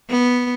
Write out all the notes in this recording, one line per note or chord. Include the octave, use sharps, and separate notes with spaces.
B3